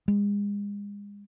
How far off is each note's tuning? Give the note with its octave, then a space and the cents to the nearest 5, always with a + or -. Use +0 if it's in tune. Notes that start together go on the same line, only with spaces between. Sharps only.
G#3 -35